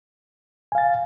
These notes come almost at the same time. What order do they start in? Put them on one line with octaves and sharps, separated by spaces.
G#5 F5 A6